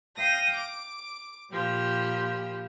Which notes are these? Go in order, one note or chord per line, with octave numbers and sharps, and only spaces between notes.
F5 G5 D#6 A#6
D6
A#2 F3 G3 G4